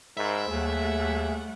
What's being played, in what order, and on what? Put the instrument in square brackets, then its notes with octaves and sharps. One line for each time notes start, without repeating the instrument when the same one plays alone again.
[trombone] G#2 [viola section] A#4 C5 B5 [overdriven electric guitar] E5
[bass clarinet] D#2 [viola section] G3 A3 F#5 [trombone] G#4